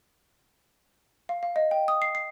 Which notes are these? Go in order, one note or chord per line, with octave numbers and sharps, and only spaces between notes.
F5
F5
D#5
G5
D#6
C7
C7